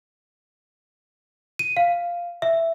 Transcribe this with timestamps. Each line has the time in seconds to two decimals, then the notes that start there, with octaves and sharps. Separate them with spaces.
1.59 D#7
1.77 F5
2.42 E5